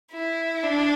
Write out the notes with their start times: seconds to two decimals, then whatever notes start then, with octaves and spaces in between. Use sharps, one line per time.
0.12 E4
0.64 D4